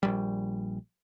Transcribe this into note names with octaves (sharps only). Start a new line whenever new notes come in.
A#1 G3